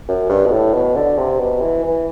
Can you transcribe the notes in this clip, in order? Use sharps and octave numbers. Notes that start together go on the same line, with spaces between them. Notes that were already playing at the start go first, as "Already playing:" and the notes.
F#2
G2
B2
A2
B2
D3
C3
B2
E3
E3